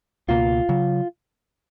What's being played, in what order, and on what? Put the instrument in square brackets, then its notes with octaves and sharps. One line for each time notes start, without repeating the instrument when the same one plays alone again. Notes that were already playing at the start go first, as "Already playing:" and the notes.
[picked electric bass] C#2 B2 A#3 [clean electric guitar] F4
[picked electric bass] C#3 F#3